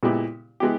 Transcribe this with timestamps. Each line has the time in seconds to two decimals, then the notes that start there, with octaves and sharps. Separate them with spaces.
0.03 A#2 G#3 B3 E4 G4
0.60 G#3 B3 E4 G4